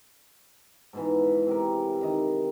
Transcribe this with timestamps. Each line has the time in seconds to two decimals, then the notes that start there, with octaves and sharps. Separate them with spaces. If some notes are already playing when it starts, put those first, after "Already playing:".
0.93 G#2 B2 E3
1.47 C3 G4 A#4
2.01 D#3 D#5